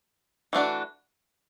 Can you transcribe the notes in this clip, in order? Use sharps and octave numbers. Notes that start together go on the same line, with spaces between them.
E3 A3 D4 F#4